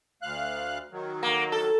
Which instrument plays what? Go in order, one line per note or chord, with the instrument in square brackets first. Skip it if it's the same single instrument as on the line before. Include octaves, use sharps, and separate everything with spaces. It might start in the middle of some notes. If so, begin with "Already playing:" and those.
[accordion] D2 F5 F#6
D#3 F#3
[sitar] A#3
A4